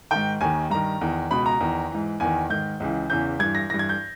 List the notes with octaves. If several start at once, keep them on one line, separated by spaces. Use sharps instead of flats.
G#2 D#3 G5
D#2 D#3 G#5
G2 D#3 A#5
E2 D#3
C#2 B2 B5
A#5
E2 D#3
G#2 E3
E2 D#3 G#5
G#2 D#3 G6
C#2 C#3 E3
E2 C#3 E3 G6
G2 E3 G#6
A#6
G2 E3 A#6
G#6
G6